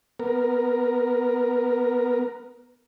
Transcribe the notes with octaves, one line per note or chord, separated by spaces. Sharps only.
B3 A#4